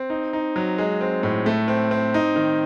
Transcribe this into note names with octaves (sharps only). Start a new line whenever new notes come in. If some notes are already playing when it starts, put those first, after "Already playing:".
Already playing: C4
D#4
D#4
F#3
G#3
C4
A2
A3
C4
C4
D#4
D#3